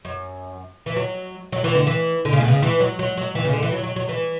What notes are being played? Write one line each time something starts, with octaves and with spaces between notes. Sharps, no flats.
F#2
E3
F#3
F#3
E3
D3
E3
D3
C#3
B2
C#3
E3
F#3
F#3
F#3
E3
C#3
D3
E3
F#3
F#3
F#3
E3